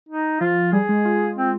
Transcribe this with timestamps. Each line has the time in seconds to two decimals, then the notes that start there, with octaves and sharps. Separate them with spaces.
0.09 D#4
0.40 F3 F4
0.73 G3 G#4
0.89 G#3
1.05 F4
1.36 C4